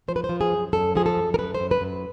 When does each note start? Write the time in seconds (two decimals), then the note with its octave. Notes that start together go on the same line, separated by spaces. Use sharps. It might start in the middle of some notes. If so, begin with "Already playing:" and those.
0.08 F3 C5
0.16 B4
0.24 C5
0.29 F3
0.41 G#4
0.51 F#2
0.73 F#2 A4
0.95 F3 G#4
1.06 A4
1.17 F#2
1.34 A#4
1.38 F#2 B4
1.54 C5
1.60 F#2
1.71 B4
1.81 F#2